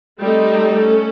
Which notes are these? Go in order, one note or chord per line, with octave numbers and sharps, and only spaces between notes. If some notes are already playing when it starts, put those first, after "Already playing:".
G3 A3 C4 D#4 A4
C#4